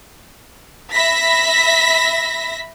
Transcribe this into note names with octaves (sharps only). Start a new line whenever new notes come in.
E5 B5 A#6 B6